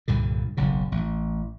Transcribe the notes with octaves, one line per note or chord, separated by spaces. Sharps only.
C2 G2 A#2 D3
F#1 B1 C#3
A1